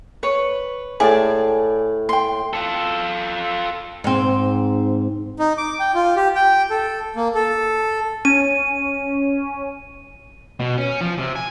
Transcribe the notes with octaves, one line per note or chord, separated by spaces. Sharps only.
B4 C#5
A2 G#4 D5 A5
G5 C6
F4 A4
G#2 C4
D#4
D6
G5
F4
G4
G5
A4
A#3
A4
C#4 D#7
B2
C#4
F3
C3
G#5